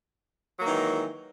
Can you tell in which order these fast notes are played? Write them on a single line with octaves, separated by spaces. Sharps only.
F#3 A#3 D#3 E3 G#3